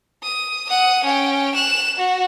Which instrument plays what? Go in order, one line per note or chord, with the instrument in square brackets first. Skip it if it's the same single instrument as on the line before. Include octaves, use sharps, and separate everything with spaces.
[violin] D#6
F#5 D#6
C#4 G5
F#6 E7
F#4